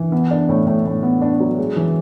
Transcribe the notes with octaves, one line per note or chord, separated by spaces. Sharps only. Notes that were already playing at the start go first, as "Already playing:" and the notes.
Already playing: E3
B3
D4
A2
A2
A2
B3
D4
F#3
G#3
E3